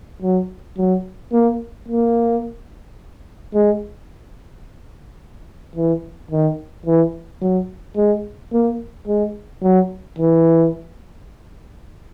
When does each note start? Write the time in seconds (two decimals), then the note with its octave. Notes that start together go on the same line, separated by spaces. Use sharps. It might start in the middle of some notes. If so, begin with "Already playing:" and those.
0.22 F#3
0.78 F#3
1.33 A#3
1.88 A#3
3.54 G#3
5.76 E3
6.31 D#3
6.86 E3
7.42 F#3
7.97 G#3
8.53 A#3
9.07 G#3
9.63 F#3
10.19 E3